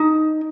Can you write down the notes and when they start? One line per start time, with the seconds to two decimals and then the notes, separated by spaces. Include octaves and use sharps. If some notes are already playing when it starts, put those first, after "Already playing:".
Already playing: D#4